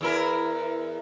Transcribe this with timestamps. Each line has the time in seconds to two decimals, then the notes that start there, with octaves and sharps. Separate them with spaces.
0.01 E2 E4 A#4